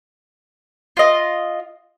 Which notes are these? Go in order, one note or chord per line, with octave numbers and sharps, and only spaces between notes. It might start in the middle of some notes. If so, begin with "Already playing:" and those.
F4 D#5